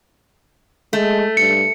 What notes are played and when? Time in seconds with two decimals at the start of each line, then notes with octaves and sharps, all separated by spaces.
0.93 G#3 A3
1.37 G2 C#7